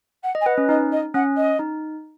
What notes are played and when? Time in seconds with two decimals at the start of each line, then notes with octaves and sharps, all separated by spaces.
0.23 F#5
0.35 D#5
0.41 G#5
0.46 B4 F#5
0.58 C#4
0.69 D#4 D#5
0.92 D#5
1.14 C#4 F#5
1.37 D#5
1.59 D#4